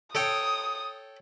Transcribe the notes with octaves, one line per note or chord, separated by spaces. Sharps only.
A4 C#5 G5 D#6